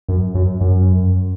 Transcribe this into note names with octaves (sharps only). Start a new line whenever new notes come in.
F#2
F#2
F#2